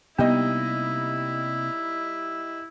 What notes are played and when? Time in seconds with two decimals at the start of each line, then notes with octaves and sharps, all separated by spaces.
0.19 C3 G3 A#3 B3 D#4 E4 D#5